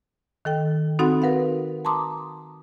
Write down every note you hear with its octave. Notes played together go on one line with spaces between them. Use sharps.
D#3 A4 G5
C4 D#4 F#4 A4 F#5 B5
A#4 B4 F5 F#5
A5 A#5 C6 D6 D#6